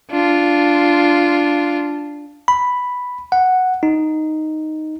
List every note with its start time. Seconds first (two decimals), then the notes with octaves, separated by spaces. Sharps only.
0.11 D4 F4
2.48 B5
3.32 F#5
3.83 D#4